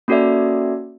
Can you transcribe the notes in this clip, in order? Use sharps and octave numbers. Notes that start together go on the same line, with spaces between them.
A#3 C#4 F#4 A4 D5 E5